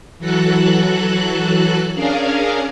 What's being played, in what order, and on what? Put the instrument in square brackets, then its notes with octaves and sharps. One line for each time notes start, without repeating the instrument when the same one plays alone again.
[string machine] E3 F#3 F#4 A4 F#6
C#4 D4 G#4 A#4 F5